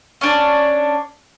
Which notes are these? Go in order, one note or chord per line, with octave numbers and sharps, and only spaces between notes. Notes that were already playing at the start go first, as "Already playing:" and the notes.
C#4 D4 D5